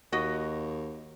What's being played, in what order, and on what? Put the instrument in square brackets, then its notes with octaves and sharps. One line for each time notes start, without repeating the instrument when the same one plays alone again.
[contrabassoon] D#2 [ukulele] F#4 D#5